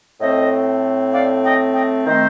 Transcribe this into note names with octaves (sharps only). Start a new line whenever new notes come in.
A2 A3 C4 C5 D#5
D5 F5
D#5 G5
D#5 G5
D#3 A3 C4 C5 D#5